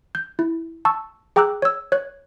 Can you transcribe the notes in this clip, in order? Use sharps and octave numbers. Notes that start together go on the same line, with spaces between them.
G6
E4
A5 C#6 E6
G#4 G5 A#5 D6 E6 F#6
C#5 E6
C#5 F#6 G#6